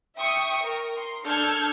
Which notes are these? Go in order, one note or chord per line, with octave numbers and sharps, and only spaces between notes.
E5 G5 C#6 D#6
A#4
C6
D4 A4 F6 G6 G#6